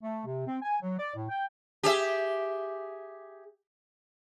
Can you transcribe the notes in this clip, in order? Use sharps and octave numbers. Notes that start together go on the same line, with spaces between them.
A3
C3
C4
G#5
F#3
D5
A2
G5
G4 G#4 E5